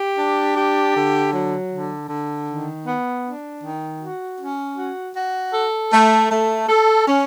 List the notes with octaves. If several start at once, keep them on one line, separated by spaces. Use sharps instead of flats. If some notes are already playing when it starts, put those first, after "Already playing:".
Already playing: G4
D4
G4
D3
F#3
D3
D3
D#3
B3
D4
D#3
F#4
C#4
F#4
F#4
A4
A3
A3
A4
C#4